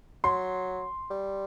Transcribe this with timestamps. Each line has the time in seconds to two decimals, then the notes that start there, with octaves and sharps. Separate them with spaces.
0.24 F#3 C6
1.10 G3